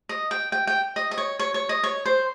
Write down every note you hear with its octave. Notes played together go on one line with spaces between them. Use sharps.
D#5
G5
G5
G5
D#5
D#5
C#5
C#5
C#5
D#5
C#5
C5